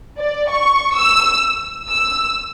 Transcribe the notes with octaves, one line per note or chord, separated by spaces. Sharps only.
D5
C#6
E6
E6